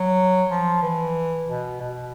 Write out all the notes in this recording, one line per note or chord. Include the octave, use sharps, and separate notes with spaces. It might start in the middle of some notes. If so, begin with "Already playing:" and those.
Already playing: F#3
F3
E3
B2
B2